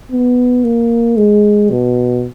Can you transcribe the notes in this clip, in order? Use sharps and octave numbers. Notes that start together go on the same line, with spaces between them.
B3
A#3
G#3
B2